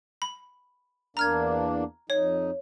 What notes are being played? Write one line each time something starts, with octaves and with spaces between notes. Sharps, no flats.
B5
E2 A#3 D4 A#5 F6 G#6
F2 D#4 C#5